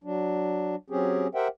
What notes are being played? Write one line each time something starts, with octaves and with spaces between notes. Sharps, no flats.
F#3 D4
F#3 C4 C#4 G4 G#4
G4 A#4 C5 E5 F#5 G5